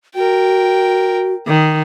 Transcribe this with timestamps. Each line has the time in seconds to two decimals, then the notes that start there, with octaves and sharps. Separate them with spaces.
0.15 F#4 A#4 G5
1.47 D#3